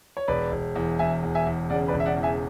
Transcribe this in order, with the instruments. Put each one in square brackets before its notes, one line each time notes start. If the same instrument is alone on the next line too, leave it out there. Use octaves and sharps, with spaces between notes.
[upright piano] C#5
[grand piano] E1 [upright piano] B4 D5
[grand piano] E1
E2
[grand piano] E2 [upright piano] E5 G#5
[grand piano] E2
[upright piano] E5 G#5
[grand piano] E2
[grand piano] C#3 [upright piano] D5 F#5
[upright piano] B4 D5
[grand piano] E1
[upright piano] E5
D5 F#5
[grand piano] E2
[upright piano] E5 G#5